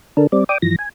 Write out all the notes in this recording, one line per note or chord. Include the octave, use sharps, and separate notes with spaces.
D3 D4 A4 A#4
G3 C4 D5
D5 G5 D6 D#6
G2 E3 F3 A#6
G#5